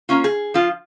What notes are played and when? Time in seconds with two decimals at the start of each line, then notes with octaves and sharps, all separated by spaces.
0.09 A#3 C#4 F4
0.24 G#4
0.54 F3 F4